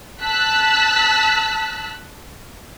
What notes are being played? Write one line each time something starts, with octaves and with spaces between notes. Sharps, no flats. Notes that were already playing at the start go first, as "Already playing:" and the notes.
A5 E6 F#6 B6